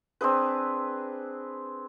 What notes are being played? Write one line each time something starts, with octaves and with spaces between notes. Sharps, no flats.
C4 D4 G#4 B4